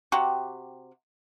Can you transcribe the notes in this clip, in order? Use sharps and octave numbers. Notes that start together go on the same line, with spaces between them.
C3 F#4 G4